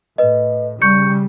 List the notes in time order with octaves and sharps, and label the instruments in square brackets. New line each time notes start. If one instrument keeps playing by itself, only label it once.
[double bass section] A2 [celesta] B4 D#5
[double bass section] C#3 G3 [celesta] C#6 G6 C#7